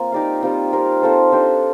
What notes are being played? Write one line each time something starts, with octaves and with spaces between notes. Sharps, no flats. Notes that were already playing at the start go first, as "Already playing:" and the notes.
Already playing: A#3 C4 F4
D#4 G4 D5 F5
G3 C4 F4
C4 G4 A#4 F5
C4 F4 A4 C5
D4 G4 C5 D#5